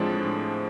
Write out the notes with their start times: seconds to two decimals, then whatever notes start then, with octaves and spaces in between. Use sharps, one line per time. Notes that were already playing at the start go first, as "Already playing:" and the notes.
Already playing: A2 F3 G#3 C4 D4
0.25 A2